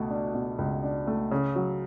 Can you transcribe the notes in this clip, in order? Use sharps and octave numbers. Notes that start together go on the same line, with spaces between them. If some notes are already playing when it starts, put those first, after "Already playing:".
Already playing: C#2 B2 A3
D4
B2
C#2
D4
A3
C#3
F#3